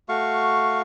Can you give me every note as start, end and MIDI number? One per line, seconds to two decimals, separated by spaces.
0.09 0.82 57
0.09 0.82 66
0.09 0.82 77
0.09 0.82 85